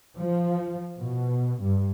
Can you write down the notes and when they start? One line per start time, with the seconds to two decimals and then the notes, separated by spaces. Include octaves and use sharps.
0.18 F3
0.98 B2
1.63 G2